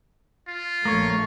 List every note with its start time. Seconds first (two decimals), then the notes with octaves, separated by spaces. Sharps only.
0.48 F4
0.85 A#1 A3 A#3 C#5